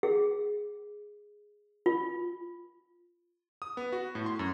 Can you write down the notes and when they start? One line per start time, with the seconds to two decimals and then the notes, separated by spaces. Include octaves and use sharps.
0.03 G#4
1.86 F4
3.62 D#6
3.77 B3
3.92 F#4
4.15 A2
4.26 C6
4.39 F#2